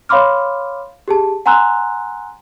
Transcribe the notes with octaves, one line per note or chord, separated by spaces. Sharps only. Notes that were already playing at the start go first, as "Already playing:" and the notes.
C#5 F5 B5 C6 D6 F6
G4 G#4 A5
F#5 G#5 A#5 C6 E6 F#6